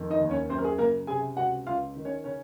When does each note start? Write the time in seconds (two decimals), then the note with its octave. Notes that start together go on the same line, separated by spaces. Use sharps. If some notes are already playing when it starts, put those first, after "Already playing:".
Already playing: F2 D#3
0.10 D#4 D#5
0.20 D#2
0.30 C#4 C#5
0.49 F#2 C4 C5
0.58 A#4
0.64 G#4
0.78 C#3 A#3 A#4
1.07 C3 G#4 G#5
1.37 C#2 F#4 F#5
1.67 C#2 F4 F5
1.96 D#3
2.05 C#4 C#5
2.24 C#3 C#4 C#5